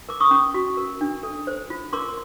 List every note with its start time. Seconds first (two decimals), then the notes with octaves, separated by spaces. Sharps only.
0.09 A#4 D6
0.20 C#6 D#6
0.31 C#4
0.54 F#4
0.77 A#4
1.01 D4
1.23 A4
1.47 C5
1.70 F4
1.93 A#4 C6 D6